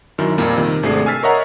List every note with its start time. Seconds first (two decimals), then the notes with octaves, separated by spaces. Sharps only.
0.18 F#2 D#3 E4
0.38 F2 A#2 G3 A#3
0.57 C3 D#3
0.83 G#1 C3 A3 D4 G#4 C7
1.06 G#5 E6 F6 A6 B6 C7
1.23 A#4 C#5 D#5 E5 F#5 A#5